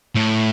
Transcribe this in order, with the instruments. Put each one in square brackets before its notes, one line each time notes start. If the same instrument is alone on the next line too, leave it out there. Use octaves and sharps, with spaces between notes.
[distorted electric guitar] A2